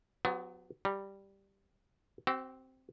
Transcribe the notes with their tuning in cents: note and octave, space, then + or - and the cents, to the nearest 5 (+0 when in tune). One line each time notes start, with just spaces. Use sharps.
F#3 -30 B3 +30 G4 +5
G3 +0 A#5 -15
C4 +0 F#4 +45